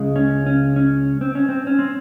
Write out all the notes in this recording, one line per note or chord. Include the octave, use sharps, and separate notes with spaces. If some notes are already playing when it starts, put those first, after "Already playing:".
Already playing: C#2 C#3 G#3
C#4
C#4
C#4
C4
C#4
C4
C#4
C4